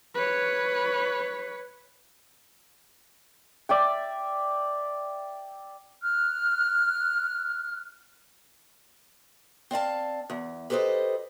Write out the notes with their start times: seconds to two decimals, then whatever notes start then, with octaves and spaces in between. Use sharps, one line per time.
0.14 B4 C#5
3.69 D5 E5 G5
6.02 F6 F#6
9.71 C4 D5 F5 A5
10.30 E2
10.70 G4 A4 B4 C5 D#5